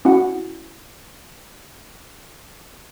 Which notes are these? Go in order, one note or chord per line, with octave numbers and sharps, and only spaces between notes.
C#4 E4 F#4 F#5